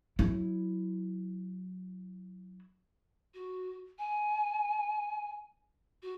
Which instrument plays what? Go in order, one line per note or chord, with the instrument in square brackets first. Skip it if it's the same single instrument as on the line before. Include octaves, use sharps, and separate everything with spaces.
[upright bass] F#3 E4
[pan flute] F#4
G#5
F#4